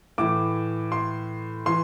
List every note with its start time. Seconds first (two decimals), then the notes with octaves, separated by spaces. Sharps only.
0.18 A2 E3 D6
0.92 C6
1.66 E3 C6